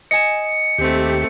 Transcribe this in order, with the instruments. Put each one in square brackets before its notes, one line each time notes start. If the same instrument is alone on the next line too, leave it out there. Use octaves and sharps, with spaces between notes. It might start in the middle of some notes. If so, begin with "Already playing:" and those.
[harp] D#5 G#5 E7 [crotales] C#7
[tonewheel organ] D#2 G4 [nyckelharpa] A3 C4